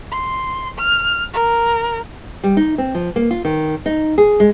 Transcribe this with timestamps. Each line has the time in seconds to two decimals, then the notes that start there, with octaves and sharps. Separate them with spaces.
0.12 C6
0.79 F6
1.33 A#4
2.44 G3
2.57 D#4
2.78 C4
2.95 F3
3.16 A#3
3.31 F4
3.45 D#3
3.86 D#4
4.18 G#4
4.40 G#3